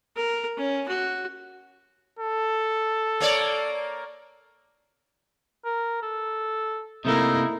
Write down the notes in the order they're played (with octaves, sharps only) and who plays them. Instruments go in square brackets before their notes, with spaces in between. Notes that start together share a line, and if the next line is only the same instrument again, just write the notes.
[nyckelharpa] A#4
C#4
F#4
[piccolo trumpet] A4
[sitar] A#3 C#5 D5
[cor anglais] A#4
A4
[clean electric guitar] C3 A3 A#3 [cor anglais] D#4 [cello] E4 A#4